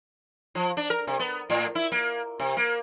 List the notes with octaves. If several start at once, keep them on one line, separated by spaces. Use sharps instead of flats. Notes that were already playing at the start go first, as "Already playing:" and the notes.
F3
D4
A#4
C3
B3
A2
E4
A#3
C3
A#3